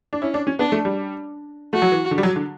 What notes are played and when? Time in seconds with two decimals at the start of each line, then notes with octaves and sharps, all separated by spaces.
0.13 D4
0.22 C#4 E4
0.34 D4
0.47 C#4
0.59 B3 D4
0.72 A3
0.85 G3
1.73 A3 F#4
1.82 F#3
1.92 E3
2.11 D3
2.18 G3
2.23 F#3
2.36 D3